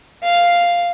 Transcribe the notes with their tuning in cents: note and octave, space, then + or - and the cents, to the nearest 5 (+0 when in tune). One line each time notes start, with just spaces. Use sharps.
F5 +0